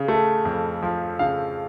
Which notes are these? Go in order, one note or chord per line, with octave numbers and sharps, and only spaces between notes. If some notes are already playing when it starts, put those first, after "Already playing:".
Already playing: C#3
A3
F2
F3
C#3 F5